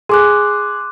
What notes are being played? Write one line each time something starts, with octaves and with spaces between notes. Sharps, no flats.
G#4 C6 D6 F#6